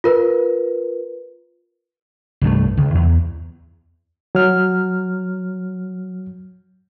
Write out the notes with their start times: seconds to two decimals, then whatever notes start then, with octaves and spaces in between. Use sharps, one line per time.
0.04 F4 A#4 B4
2.41 C2 G2 A3
2.77 C#2
2.95 E2
4.35 F#3 F6